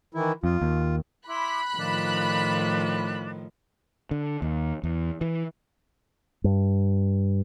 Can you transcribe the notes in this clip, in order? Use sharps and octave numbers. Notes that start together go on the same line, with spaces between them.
D#3 E3 E4
F2 F4
D#2
E4 B5 C6 D6 F#6
A2 D#3 F3 D4 F4
D3
D#2
E2
E3
G2